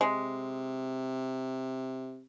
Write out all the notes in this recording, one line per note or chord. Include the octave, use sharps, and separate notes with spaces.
C3 G#3